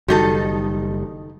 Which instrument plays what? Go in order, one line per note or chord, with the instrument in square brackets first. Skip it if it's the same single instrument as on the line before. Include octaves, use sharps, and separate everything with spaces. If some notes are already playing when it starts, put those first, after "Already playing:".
[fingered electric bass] F#1 G3 [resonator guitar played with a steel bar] D#3 D#4 A4 [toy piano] F#4